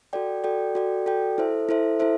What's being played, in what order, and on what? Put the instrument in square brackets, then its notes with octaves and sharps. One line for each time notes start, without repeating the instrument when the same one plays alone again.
[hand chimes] F#4 A4 D5 G5
F#4 A4 D5 G5
F#4 A4 D5 G5
F#4 A4 D5 G5
E4 A4 C5 E5
E4 A4 C5 E5
E4 A4 C5 E5